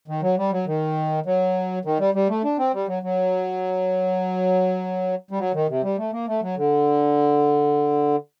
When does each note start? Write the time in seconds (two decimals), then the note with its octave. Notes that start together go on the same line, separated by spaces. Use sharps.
0.08 D#3
0.22 F#3
0.38 G3
0.52 F#3
0.67 D#3
1.26 F#3
1.85 D#3
1.99 G3
2.14 G3
2.29 A3
2.44 D4
2.59 C4
2.73 G3
2.88 F#3
3.03 F#3
5.31 G3
5.39 F#3
5.54 D#3
5.69 C3
5.83 G3
5.98 A3
6.12 A#3
6.27 A3
6.42 F#3
6.57 D3